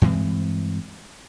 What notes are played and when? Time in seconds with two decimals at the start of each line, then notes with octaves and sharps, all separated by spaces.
0.02 G2 E3 G#3 C4